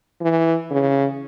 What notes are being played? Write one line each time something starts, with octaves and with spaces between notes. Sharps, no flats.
E3
C#3